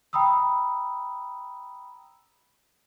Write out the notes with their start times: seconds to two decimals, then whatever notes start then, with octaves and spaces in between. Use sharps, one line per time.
0.13 G5 A#5 B5 D#6 E6